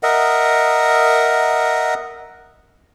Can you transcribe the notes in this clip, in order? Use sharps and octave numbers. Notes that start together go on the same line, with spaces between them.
A#4 D#5 E5 F#5